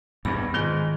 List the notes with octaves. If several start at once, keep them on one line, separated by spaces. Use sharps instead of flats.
E2 G2 B5
G#2 D#3 F4